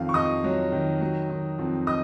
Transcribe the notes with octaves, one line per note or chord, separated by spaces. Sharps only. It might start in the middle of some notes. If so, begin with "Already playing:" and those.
Already playing: F2 D#3 F#3 F5
C#6
F2 D#5 D#6
F#3
D#3
F#3
D#3
F2
D#5 D#6